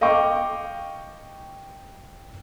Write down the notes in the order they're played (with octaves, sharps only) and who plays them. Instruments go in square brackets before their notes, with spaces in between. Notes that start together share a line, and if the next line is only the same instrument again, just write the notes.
[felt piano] D#5 F5 G5 C#6 D6